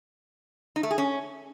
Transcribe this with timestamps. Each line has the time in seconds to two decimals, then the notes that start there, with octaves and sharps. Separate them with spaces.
0.76 D#4
0.83 A3
0.91 G#4
0.98 C#4